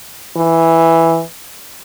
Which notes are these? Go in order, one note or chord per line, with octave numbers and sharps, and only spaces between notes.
E3